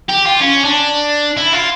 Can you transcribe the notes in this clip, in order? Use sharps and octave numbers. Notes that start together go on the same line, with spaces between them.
G4
F4
C#4
D4
E4
F4